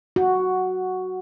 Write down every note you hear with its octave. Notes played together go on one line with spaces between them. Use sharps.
F#4